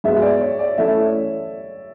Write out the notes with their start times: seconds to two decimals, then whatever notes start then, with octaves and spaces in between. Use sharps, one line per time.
0.04 G#2 G#3 B3 F#4 E5
0.22 D5
0.41 C#5
0.59 D5
0.78 E3 A3 C#4 E4 A4 E5